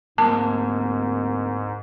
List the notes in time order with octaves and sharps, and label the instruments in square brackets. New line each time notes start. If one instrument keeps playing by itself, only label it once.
[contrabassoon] D1 [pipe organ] G#2 [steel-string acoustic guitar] A#3 [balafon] A5